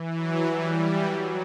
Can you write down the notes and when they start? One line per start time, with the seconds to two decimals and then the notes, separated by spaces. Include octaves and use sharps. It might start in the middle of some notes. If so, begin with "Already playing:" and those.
Already playing: E3
0.15 F#3
0.45 E3 G3
0.75 E3
1.06 F#3